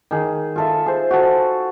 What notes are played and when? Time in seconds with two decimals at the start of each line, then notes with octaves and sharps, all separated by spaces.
0.11 D#3 G#4
0.56 F4 A4 E5
0.86 G#4 C5
1.11 F#4 A4